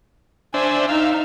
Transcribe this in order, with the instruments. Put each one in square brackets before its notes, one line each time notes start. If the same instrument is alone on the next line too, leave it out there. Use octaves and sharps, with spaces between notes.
[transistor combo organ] D4 C5 E5 [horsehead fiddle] G#5
[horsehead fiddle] D#4 [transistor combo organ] E5 F5